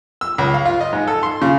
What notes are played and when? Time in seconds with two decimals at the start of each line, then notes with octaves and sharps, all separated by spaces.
0.21 E6
0.38 C#2
0.54 F5
0.65 F4
0.81 D#5
0.93 G#2
1.08 A4
1.23 C6
1.42 C#3